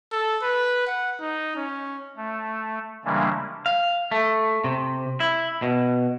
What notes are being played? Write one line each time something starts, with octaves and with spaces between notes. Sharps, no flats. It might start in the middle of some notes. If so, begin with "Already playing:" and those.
A4
B4
F#5
D#4
C#4
A3
C#3 E3 G3 G#3 A#3 D4
F5
A3
C3
E4
B2